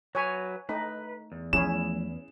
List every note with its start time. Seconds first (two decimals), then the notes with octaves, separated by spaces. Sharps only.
0.15 F#3 B4 C#5 G#5
0.69 A3 D#4 B4
1.32 E2
1.53 F3 A3 C#4 E4 G#4 E7